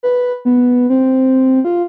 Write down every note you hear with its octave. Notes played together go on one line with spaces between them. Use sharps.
B4
B3
C4
F4